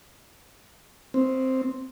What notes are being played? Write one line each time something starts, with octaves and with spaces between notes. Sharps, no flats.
C4